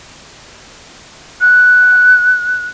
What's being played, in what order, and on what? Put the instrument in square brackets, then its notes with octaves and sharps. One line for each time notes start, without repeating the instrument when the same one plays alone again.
[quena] F#6